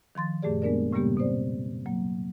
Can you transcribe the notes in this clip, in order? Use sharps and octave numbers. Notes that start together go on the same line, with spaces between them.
D#3 F3 C6 A6
F#2 A#2 A3 G4 G#4 D5
G#3 A#3 B3 D4 A#4 D5
A2 C#3 G3 A#3 B3 G4
B2 C4 C5 D5
F#3 A#3